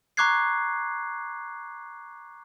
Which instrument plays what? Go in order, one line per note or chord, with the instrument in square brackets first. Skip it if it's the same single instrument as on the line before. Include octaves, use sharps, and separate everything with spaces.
[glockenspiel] A#5 C#6 D6 F#6 G#6 C7